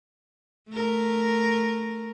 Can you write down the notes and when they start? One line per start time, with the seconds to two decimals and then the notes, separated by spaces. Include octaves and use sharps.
0.70 A3 A#4